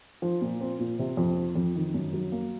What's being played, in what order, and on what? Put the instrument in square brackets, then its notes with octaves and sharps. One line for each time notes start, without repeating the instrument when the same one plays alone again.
[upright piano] F3
A#2
C4
A#2
C3
F2
F3
F2
D#3
F#2
F#3
A#3